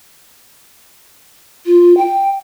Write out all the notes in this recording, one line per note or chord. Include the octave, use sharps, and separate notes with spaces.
F4
G5